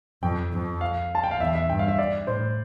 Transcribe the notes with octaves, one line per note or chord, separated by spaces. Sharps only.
F2 G5
F2
F5
A5
G5
F5
E2 E5
E5
G2 G5
F5
E5
D5
A2 C5